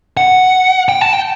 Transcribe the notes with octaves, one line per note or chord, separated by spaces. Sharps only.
F#5
G5
A5
G5